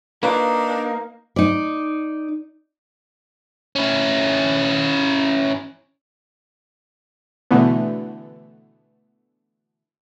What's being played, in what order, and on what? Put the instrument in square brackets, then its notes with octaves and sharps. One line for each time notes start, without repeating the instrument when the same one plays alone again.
[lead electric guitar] A#3 [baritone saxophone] D4 [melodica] D#4 [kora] F4 B4 C#5
[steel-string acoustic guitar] D#4 D5
[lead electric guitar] C#4 E4
[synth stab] B2 D3 E3 A3 B3